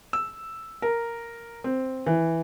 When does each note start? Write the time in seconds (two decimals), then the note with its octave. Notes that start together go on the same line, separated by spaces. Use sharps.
0.13 E6
0.82 A#4
1.64 C4
2.06 E3